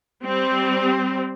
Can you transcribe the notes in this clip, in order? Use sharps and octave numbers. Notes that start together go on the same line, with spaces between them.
G3 C4